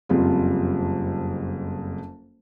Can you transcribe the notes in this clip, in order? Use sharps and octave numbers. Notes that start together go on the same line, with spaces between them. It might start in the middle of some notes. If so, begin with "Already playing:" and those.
F#1 F2 G3 F4